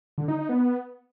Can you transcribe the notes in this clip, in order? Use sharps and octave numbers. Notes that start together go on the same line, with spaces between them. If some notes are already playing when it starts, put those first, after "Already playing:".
D3
D#4
D#4
B3